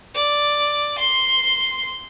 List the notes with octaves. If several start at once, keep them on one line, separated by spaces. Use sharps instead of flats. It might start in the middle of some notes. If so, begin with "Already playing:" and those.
D5
C6